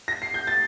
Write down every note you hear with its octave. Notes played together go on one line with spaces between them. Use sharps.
A#6
C7
G6
A6